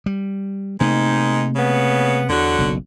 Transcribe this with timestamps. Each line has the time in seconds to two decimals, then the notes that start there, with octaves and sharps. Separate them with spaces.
0.06 G3
0.81 G#2 C3 D#3 A3 A#3 D#4
1.56 C#3 B3
2.29 E2 D3 F#3 F#4
2.59 F#1 B1